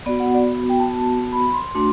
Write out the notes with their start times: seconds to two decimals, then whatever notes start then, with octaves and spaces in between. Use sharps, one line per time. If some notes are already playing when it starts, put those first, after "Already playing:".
0.06 B3 F#4 D5
0.20 F#5
0.34 D5
0.69 G5
0.80 A5
0.90 A5
1.33 B5
1.53 C6
1.75 A3 D4 F#4 C6